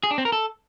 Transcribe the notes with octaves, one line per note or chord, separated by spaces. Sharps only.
G#4
D4
C4
A#4
A4